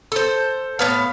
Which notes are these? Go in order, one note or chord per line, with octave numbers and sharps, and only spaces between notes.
A4 C5
A2 B3 F5